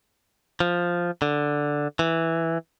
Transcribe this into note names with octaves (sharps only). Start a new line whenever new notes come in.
F3
D3
E3